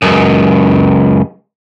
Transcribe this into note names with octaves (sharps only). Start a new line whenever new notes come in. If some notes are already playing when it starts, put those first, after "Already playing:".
C#2 F#2